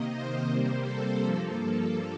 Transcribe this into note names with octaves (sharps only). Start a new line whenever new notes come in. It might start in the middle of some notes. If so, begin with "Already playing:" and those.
Already playing: C3 D#3 A#3 D#5
C5
C3 G3 A#3 C5
A4
G2 F3 A#3 A4